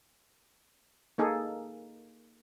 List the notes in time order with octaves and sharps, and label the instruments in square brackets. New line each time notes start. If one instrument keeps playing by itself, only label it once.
[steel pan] A#3 D#4 G#4 A4